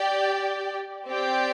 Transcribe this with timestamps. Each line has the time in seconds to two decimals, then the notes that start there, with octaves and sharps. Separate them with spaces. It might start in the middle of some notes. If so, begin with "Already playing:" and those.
Already playing: G4 D5 G5
1.07 C4 G4 D5 G5